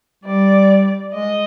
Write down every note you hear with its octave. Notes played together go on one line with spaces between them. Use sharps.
G3 D5
G#3 D#5